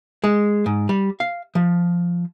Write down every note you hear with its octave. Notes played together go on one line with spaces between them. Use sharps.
G#3
G#2
G3
F5
F3